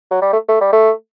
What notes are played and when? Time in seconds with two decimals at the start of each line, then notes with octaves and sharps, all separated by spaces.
0.11 F#3
0.22 G3
0.33 A3
0.48 A3
0.61 G3
0.73 A3